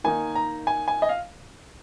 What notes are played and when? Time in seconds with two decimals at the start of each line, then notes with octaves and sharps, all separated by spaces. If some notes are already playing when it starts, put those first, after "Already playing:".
0.04 D#3 A#3 D#4 G#5
0.35 A#5
0.67 G#5
0.88 G#5
1.02 D#5
1.09 F5